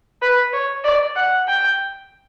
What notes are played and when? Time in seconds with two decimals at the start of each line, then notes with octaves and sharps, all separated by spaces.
0.22 B4
0.53 C#5
0.84 D5
1.16 F#5
1.47 G5